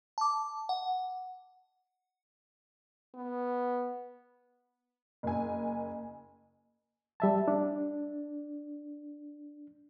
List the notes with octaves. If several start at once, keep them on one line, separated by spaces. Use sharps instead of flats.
A5 D6
F#5
B3
F#1 G#5
G3 E5 A5
D4